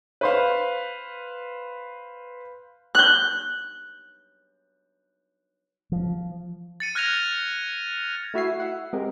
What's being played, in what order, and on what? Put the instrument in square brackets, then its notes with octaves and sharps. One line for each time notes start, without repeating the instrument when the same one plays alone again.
[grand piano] B4 C5 F5
[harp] F#6 G6
[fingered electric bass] F3
[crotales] A6 C#7 D#7
F6 F#6 G#6 A#6 D#7 F7
[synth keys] A3 E4 F#4 E5 G#5 C7
E5 F#5
G#3 C4 G4 A#4